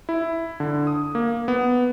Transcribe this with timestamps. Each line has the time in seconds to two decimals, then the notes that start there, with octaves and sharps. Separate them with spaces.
0.09 E4
0.60 D3
0.87 D#6
1.15 A#3
1.48 B3